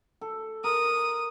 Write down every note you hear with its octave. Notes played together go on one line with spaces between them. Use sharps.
A4
A#4 D#6